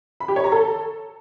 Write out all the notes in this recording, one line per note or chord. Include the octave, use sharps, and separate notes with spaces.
B5
G4
C#5
A#5
A4